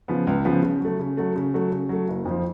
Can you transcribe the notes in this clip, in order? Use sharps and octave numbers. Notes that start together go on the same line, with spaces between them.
C#3 F3 B3
C#2
C#3 F3 B3
C#3
F#3 A3
C#3
F#3 A3
C#3
F#3 A3
C#3
F#3 A3
F#1
F2 F3